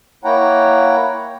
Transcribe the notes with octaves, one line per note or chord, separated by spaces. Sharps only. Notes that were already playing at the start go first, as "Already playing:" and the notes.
A#3 E4 C#5 F#5 G5 A#5